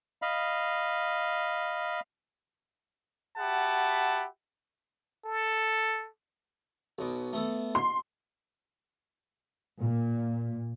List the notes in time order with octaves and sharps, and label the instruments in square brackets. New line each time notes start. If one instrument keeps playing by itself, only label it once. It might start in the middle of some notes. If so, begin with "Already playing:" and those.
[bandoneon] D#5 F5 B5
[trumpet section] F#4 G4 E5 F#5 A5 B5
[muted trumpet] A4
[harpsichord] B1 B2
A3 B3 A4
[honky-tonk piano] C6
[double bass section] A#2